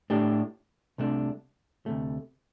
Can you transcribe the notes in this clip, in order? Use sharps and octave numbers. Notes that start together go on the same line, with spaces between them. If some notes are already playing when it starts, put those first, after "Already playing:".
A2 A3 D4 G4
C2 C3 A3 D4
D2 C3 A3